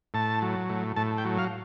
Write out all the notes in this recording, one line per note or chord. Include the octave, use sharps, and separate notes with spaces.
A2 A5
F#3
A2
A2 A5
G5
F#3
F5